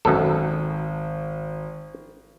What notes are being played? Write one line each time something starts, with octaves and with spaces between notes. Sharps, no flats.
G#1 F#2 B2 A4